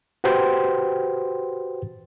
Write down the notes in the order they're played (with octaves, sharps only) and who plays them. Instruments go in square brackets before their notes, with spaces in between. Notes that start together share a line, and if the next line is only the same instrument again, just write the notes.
[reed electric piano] F#4 G4 B4 C5 G5 C6